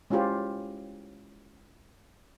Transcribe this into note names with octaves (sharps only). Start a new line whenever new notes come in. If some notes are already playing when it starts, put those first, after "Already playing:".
G#3 C#4 E4 F4 G4 C5